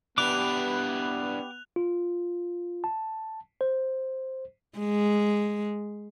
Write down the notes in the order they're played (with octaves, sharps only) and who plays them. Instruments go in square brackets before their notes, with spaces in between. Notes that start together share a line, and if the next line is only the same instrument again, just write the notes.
[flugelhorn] B3 [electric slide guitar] D4 E4 B4 [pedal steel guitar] G4 D6 [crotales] F#6 F7
[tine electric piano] F4
A5
C5
[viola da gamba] G#3